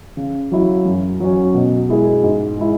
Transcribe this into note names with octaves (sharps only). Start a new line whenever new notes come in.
C#3
F#3 E4
F#2
F#3 C#4
B2
G#3 E4 G#4
G#2
G#3 E4